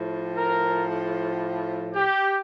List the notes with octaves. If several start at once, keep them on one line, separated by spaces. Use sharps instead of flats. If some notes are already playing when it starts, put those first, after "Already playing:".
Already playing: A2 F3
A#4
G4